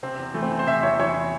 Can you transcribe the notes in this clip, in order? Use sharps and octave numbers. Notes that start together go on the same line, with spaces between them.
C3 C4
E2
E3 A3
C4
E2
C5
C3 E5
E2 C#5
C5
E3 C#5